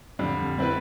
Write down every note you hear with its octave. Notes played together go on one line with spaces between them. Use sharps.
F2 D3 G3
G3 C4 E4 B4